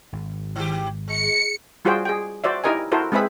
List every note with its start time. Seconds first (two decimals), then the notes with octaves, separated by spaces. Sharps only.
0.13 G#1
0.56 D#3 G4
1.08 G#3 C#7
1.85 G3 F4 F#4 G#4 C5 G5
2.05 G#4 G5
2.44 F#4 C5 D5 E5
2.64 D#4 E4 G4 A#4 D#5 G#5
2.92 E4 F#4 A4 A#4 C5
3.12 G#3 C4 G#4 B4 E5 B5